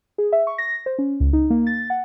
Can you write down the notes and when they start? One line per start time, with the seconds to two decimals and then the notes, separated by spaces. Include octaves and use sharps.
0.18 G#4
0.32 E5
0.47 C#6
0.58 A#6
0.86 C5
0.98 C#4
1.20 C#2
1.33 D#4
1.50 A#3
1.67 A6
1.90 F#5